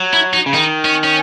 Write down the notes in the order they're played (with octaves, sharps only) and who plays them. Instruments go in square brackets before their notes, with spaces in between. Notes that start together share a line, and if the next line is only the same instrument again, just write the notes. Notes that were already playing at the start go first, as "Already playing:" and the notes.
Already playing: [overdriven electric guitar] F#3
[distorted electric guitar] E4
D#4
[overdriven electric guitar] C#3
[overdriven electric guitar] D#3 [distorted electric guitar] D#4
[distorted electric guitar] C#4
C#4